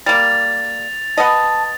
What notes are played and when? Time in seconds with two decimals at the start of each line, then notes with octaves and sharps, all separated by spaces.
0.06 G3 A#3 A6 F7
1.18 B3 D#5 A5